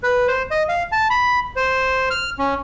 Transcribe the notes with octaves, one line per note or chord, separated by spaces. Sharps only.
B4
C5
D#5
F5
A5
B5
C5
F6
C#4